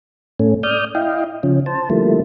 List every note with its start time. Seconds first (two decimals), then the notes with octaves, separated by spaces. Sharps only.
0.39 A2 A3 C#4
0.63 D5 D#6 F6 G6
0.95 E4 D#5 F5 G5
1.43 C#3 F3 C#4
1.66 C5 A5
1.90 D3 F3 G3 A3 A#3 E4